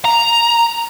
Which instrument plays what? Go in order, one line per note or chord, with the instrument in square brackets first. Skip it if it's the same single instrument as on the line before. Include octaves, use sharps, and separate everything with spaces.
[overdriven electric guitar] A#5